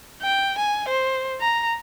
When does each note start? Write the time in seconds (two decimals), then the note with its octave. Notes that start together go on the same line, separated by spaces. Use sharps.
0.22 G5
0.58 G#5
0.88 C5
1.41 A#5